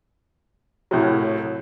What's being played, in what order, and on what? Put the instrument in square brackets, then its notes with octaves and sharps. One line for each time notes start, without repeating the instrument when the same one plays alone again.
[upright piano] C2 A2 F#3